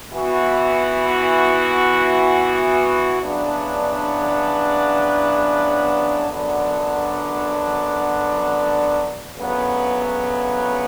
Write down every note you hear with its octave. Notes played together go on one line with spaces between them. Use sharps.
E3 B3 F#4
E2 C#3 F#3 B3 D4
F#2 D3 F#3 B3 D4
D2 C#3 F#3 B3